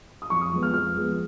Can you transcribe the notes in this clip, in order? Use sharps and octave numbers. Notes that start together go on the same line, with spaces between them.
D#6
F2 C#6
D#6
F3 G#3 B3
F6
F2 F6
F3 G#3 B3